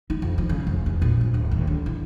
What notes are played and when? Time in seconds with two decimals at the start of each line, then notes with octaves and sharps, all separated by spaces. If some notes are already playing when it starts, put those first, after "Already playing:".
0.10 D#4
0.22 F2
0.38 F3
0.49 C#3
0.67 F1
0.86 E2
1.02 A#1
1.21 G1
1.34 D1
1.51 D#2
1.67 D3
1.86 E3